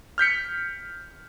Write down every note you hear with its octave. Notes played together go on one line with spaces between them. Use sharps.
F6 G6 B6 C#7